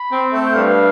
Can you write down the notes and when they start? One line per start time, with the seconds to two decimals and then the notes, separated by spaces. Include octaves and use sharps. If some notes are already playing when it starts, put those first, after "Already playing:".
Already playing: B5
0.10 C4
0.33 A3
0.45 G5
0.54 G2 F5